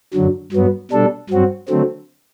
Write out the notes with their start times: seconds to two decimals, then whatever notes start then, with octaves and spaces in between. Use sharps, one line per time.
0.14 F#2 D3 F#3
0.52 G2 F#3 B3
0.91 B2 G3 D4 A4
1.30 G2 F#3 C4 F#4
1.68 D3 F#3 A3 C4